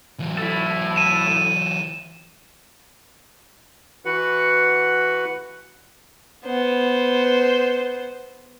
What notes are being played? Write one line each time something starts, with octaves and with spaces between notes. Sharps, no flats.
E3 F#3
E4 A4
D#7 E7
E3 F#4 B4 F#5
B3 C5